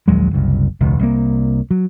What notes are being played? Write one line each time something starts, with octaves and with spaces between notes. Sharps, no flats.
A#1 D#2 F#3 G#3
F#1 C2
E1 C#2
C2 A#3
F#3